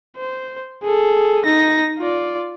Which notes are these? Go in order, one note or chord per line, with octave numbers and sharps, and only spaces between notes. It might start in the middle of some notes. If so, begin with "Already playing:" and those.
C5
G#4 A4
D#4 A#6
F4 D5